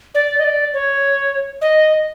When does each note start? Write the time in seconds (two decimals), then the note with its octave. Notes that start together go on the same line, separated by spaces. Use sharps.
0.15 D5
0.39 D#5
0.44 D5
0.74 C#5
1.61 D#5